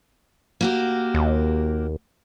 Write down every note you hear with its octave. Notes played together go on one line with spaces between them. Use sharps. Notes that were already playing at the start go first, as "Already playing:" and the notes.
A#3 F#4 G4
D#2